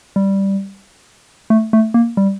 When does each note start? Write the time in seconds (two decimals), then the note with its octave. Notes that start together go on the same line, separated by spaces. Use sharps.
0.16 G3
1.50 A3
1.73 A3
1.94 A#3
2.17 G3